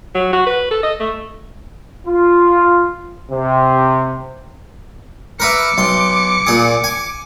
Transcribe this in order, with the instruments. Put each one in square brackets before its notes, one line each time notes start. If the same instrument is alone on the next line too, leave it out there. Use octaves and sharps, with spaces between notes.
[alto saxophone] F#3
F#4
B4
A4
D#5
A3
[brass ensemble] F4
C3
[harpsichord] A#4 B4 E5 [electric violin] D6 C#7
[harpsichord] B1 C6
A#2 G#4
G#5